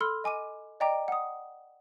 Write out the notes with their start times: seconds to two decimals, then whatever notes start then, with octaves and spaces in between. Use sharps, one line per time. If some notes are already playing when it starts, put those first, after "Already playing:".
0.01 A4 B5 C6 E6 F6 G7
0.24 D#5 G#5 D6 D#7
0.80 D5 D#5 G5 A#5 D6 D7
1.08 F#5 D#6